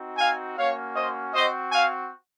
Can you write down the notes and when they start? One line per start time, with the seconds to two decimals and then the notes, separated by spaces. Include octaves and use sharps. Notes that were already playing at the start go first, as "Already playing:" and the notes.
Already playing: C4 D#4 F#4
0.18 F5 G#5
0.56 A#3 C#4 F#4 C#5 F5
0.95 C5 D#5
1.33 C4 F#4 C5 D#5
1.71 F5 G#5